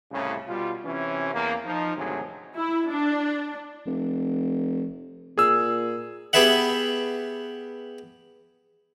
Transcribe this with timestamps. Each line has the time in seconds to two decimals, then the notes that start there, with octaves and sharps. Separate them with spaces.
0.12 C2 A2 C#3
0.47 B2 G3 F4
0.85 C3 E3 C#4
1.34 E2 A#3
1.66 F3 D#4
1.97 G#1 D2 C3 F#3 G#4
2.56 E4
2.91 D4
3.86 F1
5.38 A#2 G#4 E6
6.33 B3 G4 G#4 B4 E5 F#5